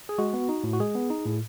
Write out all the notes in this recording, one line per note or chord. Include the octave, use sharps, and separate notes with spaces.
G#4
G#3 F#4
B3
D#4
A2
F#4
G#3 G#4
B3
D#4
A2